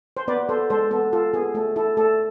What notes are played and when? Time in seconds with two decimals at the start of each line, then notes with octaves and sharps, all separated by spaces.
0.17 C5
0.28 B3 B4 D5
0.49 B3 A4 C5
0.70 G#3 A4 C5
0.91 B3 A4
1.13 F4 A4
1.34 B3 G#4
1.55 A3 A4
1.76 E4 A4
1.97 A3 A4